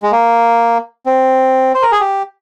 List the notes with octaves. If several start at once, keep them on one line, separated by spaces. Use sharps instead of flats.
G#3
A#3
C4
C5
A#4
G#4
G4